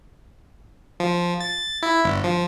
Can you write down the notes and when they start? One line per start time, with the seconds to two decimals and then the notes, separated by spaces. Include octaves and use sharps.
1.00 F3
1.40 A6
1.83 E4
2.04 G1
2.24 F3